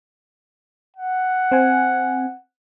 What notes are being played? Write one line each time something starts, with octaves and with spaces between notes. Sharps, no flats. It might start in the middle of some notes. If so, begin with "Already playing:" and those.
F#5
C4 G#5